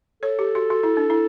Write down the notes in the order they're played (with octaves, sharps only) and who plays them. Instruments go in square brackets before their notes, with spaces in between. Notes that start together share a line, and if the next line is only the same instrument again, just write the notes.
[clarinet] A4 [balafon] C#5
[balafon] G4
F#4
F#4
E4
D4
E4